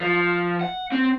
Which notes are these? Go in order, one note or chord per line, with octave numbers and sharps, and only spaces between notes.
F3
F#5
C4